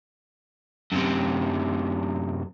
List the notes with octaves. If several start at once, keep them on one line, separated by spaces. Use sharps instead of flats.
F#2 C3